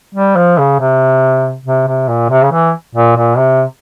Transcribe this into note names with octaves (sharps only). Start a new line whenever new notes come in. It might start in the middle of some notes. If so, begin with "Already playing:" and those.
G3
F3
C#3
C3
C3
C3
A#2
C3
C#3
E3
A#2
A#2
C3